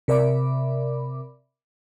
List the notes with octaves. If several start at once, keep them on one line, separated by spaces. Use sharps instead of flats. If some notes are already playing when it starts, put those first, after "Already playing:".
C3 A#4 D5 E5 B5 D6